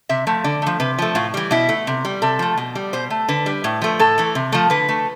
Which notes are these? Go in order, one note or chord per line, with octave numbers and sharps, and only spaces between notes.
C3 E5
F3 A3
D3 D5
F3 A3
C3 B4
F3 A3
A2 F4
E3 G3
B2 E4
A3
C3
G3
C3 A4
F3 A3
B2
G3
B2 C5
A3
D3 B4
G3
A2
F3 A3
A2 A4
E3 A3
C3
F3 A3
D3 B4
A3